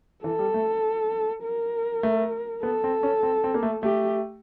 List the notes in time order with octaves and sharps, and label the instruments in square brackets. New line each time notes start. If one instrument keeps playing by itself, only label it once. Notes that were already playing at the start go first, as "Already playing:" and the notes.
[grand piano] E3 [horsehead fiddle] A4
[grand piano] G3
A3
[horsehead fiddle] A#4
[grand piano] A3
[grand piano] B3 [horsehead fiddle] A4
[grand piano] C4
C#4
C4
C4
A#3
A3
[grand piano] A3 [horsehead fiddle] G4